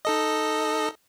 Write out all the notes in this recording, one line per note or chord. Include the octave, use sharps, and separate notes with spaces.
D#4 A4 D#5